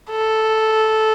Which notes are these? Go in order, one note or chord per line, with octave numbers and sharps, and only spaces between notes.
A4